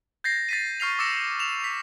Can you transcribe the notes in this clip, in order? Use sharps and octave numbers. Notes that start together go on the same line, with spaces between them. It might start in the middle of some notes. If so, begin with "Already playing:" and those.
G6 A6 A#6 C7
A6 B6 D#7
C#6 F6 C7 F7
D6 E6 A6 A#6 C#7 E7
E7 F7
B6 F7